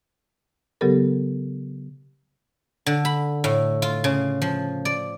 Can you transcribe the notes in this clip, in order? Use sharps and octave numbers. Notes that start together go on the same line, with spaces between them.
C#3 F#3 B3 G4 A4 A#4
D3
B5
A2
F4
C#3
F3
D5